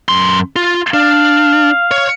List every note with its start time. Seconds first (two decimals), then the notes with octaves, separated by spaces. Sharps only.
0.09 F#2 C6
0.56 F4
0.94 D4 F5
1.91 C#5